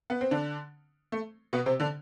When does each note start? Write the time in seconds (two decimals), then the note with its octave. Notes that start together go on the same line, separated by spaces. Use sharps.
0.10 B3
0.21 C4
0.31 D3 D4
1.12 A3
1.53 B2 B3
1.66 C3 C4
1.80 D3 D4